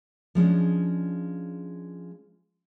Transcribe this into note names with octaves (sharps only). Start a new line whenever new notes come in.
F3 G#3 C#4 D4